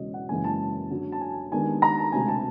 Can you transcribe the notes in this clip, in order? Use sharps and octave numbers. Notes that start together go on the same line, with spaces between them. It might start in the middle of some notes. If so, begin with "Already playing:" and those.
Already playing: E1 E2 C#3 F#3 D#5
F#5
F#1 F#2 C#3 E3 G#3 G#5
A5
F#2 D3 F#3
A5
G#5
D#2 D#3 G#3 B3 D4 G#5
A#5
A5
E1 D2 C3 G#5
A5